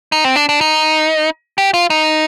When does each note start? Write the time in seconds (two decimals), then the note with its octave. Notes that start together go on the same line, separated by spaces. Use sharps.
0.12 D#4
0.24 C4
0.36 D4
0.49 D4
0.61 D#4
1.58 G4
1.74 F4
1.90 D#4